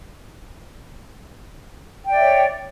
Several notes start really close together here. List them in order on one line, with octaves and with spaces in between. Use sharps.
G5 D5 E5 C#5